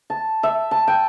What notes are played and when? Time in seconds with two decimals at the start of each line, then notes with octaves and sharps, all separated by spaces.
0.10 A5
0.43 E5
0.71 A5
0.87 G5